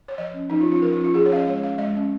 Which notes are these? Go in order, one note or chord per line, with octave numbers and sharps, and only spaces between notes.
C#5
F3 D#5
C#4
F3 D#4
F4
C#4
F4
F3 A#4
F4
C#4
F4
F3 G#4
C#5
C#4 F5
D#5
G#3 C#5
C#4 F5
G#3 D#5
C#4